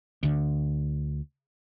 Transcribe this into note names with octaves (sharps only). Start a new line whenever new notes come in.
D2 D3